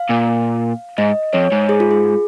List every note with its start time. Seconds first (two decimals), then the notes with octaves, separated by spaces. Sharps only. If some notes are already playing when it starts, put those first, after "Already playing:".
Already playing: F5
0.10 A#2
0.98 G#2 D#5
1.33 F2 C#5
1.52 G#2
1.69 G#4
1.80 F4
1.91 G#4